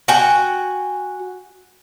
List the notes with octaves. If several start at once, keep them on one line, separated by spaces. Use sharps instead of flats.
F#4 G5 G#5